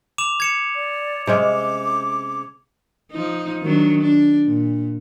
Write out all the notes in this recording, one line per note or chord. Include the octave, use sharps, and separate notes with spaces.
D6 E7 F7
G#6 C#7 E7
D5
C3 G#3 C#4 D6
F3 D#4
D#3 F#3 D4
D4
A#2